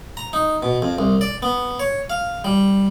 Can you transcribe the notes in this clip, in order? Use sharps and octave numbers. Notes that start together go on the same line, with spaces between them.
A#5
D#4
B2
F2
C2
D5
B3
C#5
F5
G3